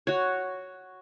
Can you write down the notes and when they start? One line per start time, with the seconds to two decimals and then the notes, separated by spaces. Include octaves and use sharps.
0.07 F#4 C#5